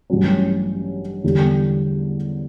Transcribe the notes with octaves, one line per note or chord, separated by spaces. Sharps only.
A1 G2 F#3 C#4
E2 D3 G3